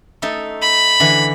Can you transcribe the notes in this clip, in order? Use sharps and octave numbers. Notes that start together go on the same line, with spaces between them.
A3 D#4 A4
B5
D3 E3